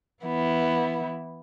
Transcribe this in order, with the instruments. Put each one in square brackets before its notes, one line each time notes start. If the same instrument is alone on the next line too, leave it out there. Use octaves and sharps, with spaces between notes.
[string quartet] E3 B3 E4